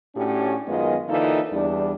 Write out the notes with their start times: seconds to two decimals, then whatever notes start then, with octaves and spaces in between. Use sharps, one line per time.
0.16 A2 C#4 D4 F#4 G4
0.68 F#2 D#3 G#3 B3 F4 D#5
1.09 D3 E3 A#3 D#4 F4 A4
1.51 E2 G3 D4